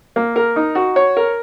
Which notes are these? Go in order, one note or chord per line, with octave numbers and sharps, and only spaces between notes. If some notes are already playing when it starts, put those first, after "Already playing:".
A#3
A#4
D#4
F#4
C#5
A#4